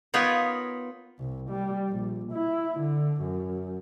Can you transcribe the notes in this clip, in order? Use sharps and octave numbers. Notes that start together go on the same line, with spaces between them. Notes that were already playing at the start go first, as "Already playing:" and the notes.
B3 D#4 F4 A#4 B4 C#5
C2
G3
A#1
E4
D3
F#2